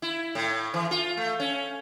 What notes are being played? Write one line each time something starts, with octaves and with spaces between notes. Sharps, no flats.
E4
A2
E3
F4
A3
C#4